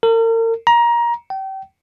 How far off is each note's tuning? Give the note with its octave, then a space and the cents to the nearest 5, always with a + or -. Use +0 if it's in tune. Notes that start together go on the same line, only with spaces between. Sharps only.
A#4 -40
A#5 +20
G5 -30